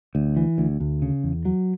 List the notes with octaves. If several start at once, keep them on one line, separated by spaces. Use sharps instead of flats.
D2
E3
D2
D2
C#3
E2
F#3